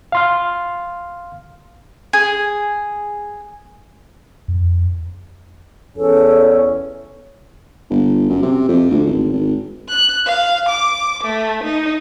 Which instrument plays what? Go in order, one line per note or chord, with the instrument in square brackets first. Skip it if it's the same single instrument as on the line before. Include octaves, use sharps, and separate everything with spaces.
[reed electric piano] F5 C6 F6
[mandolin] G#4
[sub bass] F2
[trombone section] E2 C#4 [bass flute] A4
[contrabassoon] G1
F#2
C3
F2
D2
G#1
G#1
[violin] F#6
F5
D6
A3
D#4